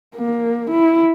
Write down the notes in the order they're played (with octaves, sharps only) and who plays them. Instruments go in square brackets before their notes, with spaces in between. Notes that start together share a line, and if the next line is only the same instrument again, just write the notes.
[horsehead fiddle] A#3
E4